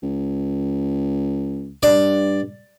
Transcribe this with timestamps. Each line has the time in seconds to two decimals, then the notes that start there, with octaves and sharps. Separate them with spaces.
0.02 C#2
1.83 G2 D5